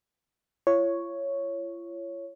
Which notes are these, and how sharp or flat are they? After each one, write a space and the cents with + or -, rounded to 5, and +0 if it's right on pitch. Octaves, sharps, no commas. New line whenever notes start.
F4 -45 C#5 +0